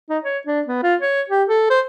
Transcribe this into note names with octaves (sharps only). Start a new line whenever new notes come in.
D#4
C#5
D4
B3
F4
C#5
G4
A4
C5